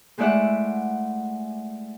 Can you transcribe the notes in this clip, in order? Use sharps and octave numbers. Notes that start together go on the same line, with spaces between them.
G#3 A3 E4 D5 E5 F#5